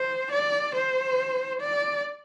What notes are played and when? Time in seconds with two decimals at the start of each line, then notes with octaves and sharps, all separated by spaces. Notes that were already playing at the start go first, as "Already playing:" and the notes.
Already playing: C5
0.32 D5
0.75 C5
1.61 D5